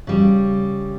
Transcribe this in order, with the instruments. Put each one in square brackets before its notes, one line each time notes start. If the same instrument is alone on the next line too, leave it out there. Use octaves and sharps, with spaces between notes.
[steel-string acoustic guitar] C#3 G3